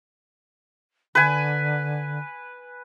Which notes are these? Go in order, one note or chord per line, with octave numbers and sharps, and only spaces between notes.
D3 B4 G#5